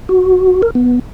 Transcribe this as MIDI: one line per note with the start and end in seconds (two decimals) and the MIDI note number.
0.09 0.62 66
0.62 0.70 70
0.75 0.99 59